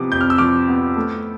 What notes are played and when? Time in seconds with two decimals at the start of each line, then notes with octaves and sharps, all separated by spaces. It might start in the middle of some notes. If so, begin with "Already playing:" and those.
Already playing: C3 F3 B3 D6
0.12 F2 G6
0.21 F6
0.30 E6
0.38 F3 D6 F6
0.68 B3
0.97 A3